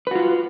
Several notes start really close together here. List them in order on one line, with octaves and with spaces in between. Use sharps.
B4 F#4 F4